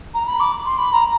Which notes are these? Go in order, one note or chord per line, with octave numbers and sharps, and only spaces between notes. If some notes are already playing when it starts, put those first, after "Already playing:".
A#5
B5
D6
C6
B5
A#5